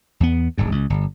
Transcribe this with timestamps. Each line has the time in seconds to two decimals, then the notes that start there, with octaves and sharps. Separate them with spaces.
0.20 E2 B3
0.58 D1 G1 G#2
0.72 C#2
0.90 G1